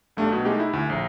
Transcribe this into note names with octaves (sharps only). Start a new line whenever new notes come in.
B1 A3 D4 G4
B2
G#3 A3 D#4 G4
E4
D2
A#1